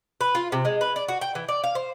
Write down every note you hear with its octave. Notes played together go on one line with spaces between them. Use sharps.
B4
F4
C3
G#3
B4
D5
F#4
G5
E3
D5
F5
C5